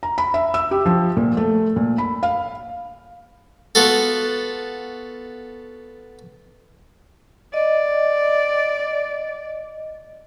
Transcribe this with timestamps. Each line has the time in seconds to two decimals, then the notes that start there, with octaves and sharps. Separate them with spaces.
0.03 A#5
0.18 B5
0.34 E5
0.54 E6
0.71 G4
0.86 F3
1.17 A#2
1.37 A3
1.76 A#2
1.98 B5
2.23 F5
3.75 B3 F4 F#4 A4
7.54 D5 D#5